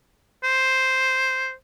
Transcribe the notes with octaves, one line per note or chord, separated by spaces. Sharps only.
C5